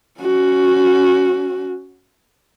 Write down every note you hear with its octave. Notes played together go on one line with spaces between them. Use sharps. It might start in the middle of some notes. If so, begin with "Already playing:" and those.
C#4 F#4